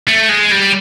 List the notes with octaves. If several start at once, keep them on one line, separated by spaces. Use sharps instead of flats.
A3
G#3
G3